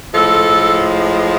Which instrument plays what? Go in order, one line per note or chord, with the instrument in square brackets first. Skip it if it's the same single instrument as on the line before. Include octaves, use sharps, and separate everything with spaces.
[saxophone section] A2 F3 G#3 A4